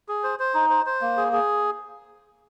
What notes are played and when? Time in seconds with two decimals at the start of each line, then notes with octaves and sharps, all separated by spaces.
0.08 G#4
0.24 C5
0.40 C5
0.54 D#4
0.70 C5
0.86 C5
1.02 A#3
1.17 G#4
1.33 G#4